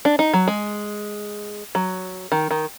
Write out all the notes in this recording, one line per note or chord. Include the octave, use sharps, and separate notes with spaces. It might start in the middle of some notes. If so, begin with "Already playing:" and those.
D4
D#4
F#3
G#3
F#3
D#3
D#3